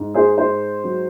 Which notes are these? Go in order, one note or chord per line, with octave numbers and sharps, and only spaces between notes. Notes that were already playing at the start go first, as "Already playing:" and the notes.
Already playing: G#2
G#4 C5
G#2 G#4 C5
F#3